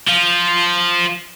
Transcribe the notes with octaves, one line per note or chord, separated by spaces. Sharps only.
F3 F4